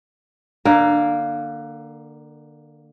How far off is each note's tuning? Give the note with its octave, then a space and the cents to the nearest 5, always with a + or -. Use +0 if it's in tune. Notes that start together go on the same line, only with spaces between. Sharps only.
D3 +25 A#3 +0